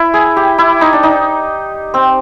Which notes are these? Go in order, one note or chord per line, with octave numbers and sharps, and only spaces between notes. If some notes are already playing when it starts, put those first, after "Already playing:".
Already playing: E4
G#4
G4
E4
D#4
D4
D#4
C4